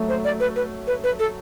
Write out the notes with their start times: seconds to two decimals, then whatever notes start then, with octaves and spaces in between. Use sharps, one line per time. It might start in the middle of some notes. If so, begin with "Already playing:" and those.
Already playing: F#3 A3
0.09 C5
0.24 D5
0.40 B4
0.56 B4
0.87 B4
1.04 B4
1.19 A4